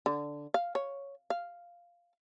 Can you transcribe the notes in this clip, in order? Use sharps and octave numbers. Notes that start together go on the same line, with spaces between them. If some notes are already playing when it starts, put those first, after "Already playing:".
D3
F5
C#5
F5